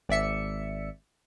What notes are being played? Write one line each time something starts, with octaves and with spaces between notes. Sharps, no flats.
G#1 D5 E5 C#7